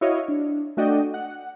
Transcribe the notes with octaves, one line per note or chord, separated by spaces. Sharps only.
E4 F#4 C#5 D#5 F5
D4
A3 D4 F#4 D5 D#5 G5
F#5